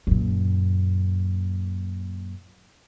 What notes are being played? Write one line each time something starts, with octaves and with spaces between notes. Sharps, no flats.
F#2 A#2